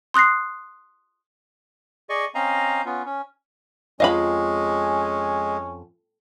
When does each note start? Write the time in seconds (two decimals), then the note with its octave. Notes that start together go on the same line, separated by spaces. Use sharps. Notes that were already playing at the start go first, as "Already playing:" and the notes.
0.14 C6 D#6 F#6 A#6 C7
2.09 G#4 D5 D#5 C#6
2.35 C4 C#4 D#5 F5 A#5
2.86 B3 C#4 F4
3.05 C#4
4.00 F2 G#3 C#4 D#5 F5 B5